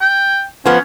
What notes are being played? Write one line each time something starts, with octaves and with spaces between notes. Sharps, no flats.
G5
F3 B3 C#4